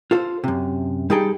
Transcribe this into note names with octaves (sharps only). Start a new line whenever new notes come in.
F4 A4 C5
F#2 C3
G3 D#4 G#4 A4 G5